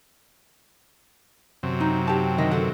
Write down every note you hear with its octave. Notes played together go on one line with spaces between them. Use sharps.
F#2 C3
D#4
G4 A5
D2 D#3 D#5
A4 F#5